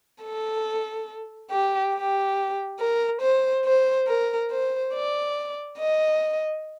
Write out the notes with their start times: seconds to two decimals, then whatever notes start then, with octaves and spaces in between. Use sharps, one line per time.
0.23 A4
1.50 G4
1.94 G4
2.79 A#4
3.22 C5
3.65 C5
4.08 A#4
4.51 C5
4.94 D5
5.79 D#5